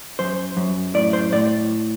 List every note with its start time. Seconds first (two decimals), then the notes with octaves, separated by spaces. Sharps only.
0.19 F#2 C5
0.57 F#2
0.94 A2 D5
1.13 C5
1.32 A2 D5